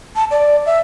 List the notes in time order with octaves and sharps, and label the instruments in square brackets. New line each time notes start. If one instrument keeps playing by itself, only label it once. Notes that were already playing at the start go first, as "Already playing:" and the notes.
[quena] A5
D5
E5